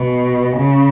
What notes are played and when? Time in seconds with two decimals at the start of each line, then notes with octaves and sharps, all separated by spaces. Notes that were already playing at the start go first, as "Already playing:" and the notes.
Already playing: B2
0.57 C#3